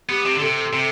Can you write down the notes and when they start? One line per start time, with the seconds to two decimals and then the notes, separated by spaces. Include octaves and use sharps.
0.09 B3 G4
0.25 C3
0.33 D3
0.41 C3 A4
0.73 C3